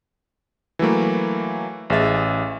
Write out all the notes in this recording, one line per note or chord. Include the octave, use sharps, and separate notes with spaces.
E3 F#3 A3 A#3
A1 G#4 E5 A6